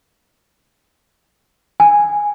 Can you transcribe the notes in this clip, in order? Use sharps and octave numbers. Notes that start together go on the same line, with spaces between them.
G#5